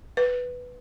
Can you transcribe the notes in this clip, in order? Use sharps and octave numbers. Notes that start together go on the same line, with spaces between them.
B4